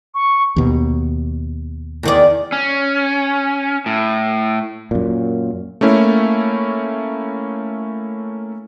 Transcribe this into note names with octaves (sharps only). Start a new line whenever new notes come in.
C#6
D#2 B2
E2 D#3 D5
C#4
A2
F#2 A#2
A3 A#3 C#4 E4